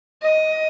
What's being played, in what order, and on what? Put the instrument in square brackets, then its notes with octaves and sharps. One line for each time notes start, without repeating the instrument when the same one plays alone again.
[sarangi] D#5